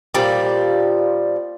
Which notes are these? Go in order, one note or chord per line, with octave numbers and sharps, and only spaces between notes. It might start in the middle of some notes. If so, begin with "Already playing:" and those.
A#2 F3 G3